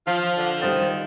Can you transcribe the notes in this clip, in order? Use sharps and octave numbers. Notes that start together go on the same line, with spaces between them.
F3 F4
D3
D#3 G3 C5 A6